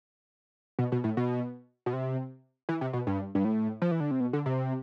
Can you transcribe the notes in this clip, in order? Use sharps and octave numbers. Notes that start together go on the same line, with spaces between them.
B2
B2
A2
B2
B2
C3
E3
C3
B2
G2
G2
A2
F3
E3
D3
C3
B2
D3
C3